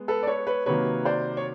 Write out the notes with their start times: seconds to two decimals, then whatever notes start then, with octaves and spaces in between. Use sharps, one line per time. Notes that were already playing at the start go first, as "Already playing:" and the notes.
Already playing: G#3 B3
0.08 A4 B4
0.23 D5
0.27 B4 C#5
0.47 B4 C#5
0.66 C3 D#3 F#3 A#3 B4 C#5
1.05 C5 D5
1.37 C#5